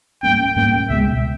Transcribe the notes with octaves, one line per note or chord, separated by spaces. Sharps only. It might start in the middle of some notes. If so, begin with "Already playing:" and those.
G#2 G3 A#3 C#4 G5
G#2 G3 A#3 C#4 G5
C#2 B2 G#3 E5